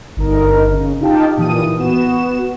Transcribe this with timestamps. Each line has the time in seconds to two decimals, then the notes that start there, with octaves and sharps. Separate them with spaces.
0.17 G1 D#4 A#4
0.73 C#3
1.01 D#4 F4 G4 G5 A5
1.37 A#2 E3 D#6 D#7
1.79 B3 F#4 E7